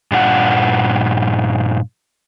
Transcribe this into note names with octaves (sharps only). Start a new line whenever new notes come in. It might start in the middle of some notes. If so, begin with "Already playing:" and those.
G2 A#2 D4 F4 F#5